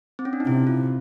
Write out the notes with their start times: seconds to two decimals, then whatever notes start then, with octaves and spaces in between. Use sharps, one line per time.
0.19 C4
0.25 C#4
0.33 D4
0.40 D#4
0.47 C3 E4
0.67 F4